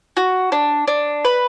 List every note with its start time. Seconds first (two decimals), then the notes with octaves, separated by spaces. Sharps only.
0.17 F#4
0.52 D4
0.88 D4
1.25 B4